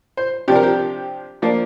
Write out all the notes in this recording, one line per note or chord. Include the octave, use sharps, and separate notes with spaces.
C5
C3 F3 D4 G4
A#4
G4
F3 A#3 D4